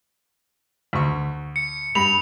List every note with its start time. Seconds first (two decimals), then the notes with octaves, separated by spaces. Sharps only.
0.93 D2 C#6
1.56 C#7
1.95 G2 B5 F7